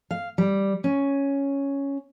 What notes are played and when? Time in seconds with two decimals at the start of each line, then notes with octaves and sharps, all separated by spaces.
0.11 F5
0.38 G3
0.84 C#4